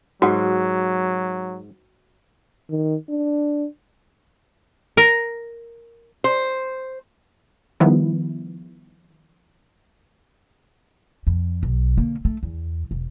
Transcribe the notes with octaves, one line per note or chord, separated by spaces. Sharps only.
G#2 F#3 F#4 F#5
D#3
D4
A#4
C5
D#3 F3 G3 B3 E4
F2
B1
D3 A#3
A3
E2
E1